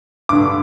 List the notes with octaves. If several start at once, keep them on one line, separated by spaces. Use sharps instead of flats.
G2 D3 D6